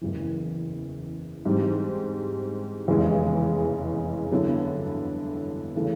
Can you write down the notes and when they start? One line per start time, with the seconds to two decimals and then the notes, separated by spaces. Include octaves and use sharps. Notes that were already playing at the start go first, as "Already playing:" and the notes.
0.01 F#1 E2 C#3 E3
1.45 G#2 E3 G3 C4
2.88 F1 E2 C#3 E3 G#3
4.31 G2 D3 F#3 B3 E4
5.76 C#3 E3 A3